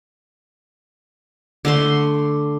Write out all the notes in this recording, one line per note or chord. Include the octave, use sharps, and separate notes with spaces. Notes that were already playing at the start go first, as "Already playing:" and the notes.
D3 A3 C6